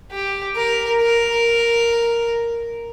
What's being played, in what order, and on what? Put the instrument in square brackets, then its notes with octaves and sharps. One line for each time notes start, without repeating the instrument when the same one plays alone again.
[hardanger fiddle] G4
A#4
A#4